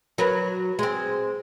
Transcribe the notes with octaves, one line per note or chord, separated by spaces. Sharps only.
F#3 A#4 B4
G#3 C4